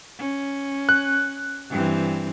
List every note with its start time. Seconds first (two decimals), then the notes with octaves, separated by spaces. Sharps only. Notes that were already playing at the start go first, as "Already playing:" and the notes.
0.19 C#4
0.89 F#6
1.70 G2 E3 C4